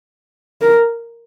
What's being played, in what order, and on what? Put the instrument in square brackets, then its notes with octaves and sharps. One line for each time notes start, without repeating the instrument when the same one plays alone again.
[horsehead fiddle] A#4